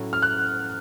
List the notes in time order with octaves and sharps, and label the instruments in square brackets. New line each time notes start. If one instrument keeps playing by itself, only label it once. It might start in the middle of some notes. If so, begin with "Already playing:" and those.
Already playing: [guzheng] A2 F#3 A3 C#4
[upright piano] F6
F#6